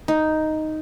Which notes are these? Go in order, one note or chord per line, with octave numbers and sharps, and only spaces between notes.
D#4